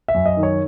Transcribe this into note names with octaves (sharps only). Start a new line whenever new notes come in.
E5
F#2
D#5
D#3
C#5